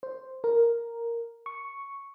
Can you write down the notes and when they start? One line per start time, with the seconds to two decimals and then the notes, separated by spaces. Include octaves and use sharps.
0.03 C5
0.44 A#4
1.46 C#6